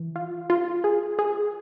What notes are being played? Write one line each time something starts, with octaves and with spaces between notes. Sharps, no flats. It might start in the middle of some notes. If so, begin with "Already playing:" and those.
Already playing: E3
F4
F4
G#4
G#4